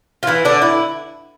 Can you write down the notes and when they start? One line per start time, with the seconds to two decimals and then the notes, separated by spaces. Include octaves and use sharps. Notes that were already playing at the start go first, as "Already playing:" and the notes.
0.23 F4
0.27 E3 E4
0.45 D3 D4
0.62 E4